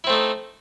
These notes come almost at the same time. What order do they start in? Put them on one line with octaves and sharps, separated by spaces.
E4 C4 A3 D#4